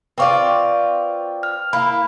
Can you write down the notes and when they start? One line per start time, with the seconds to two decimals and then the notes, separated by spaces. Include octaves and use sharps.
0.18 C4 F4 B4 D5 C#6 D6
1.43 F6
1.73 A#3 E4 B5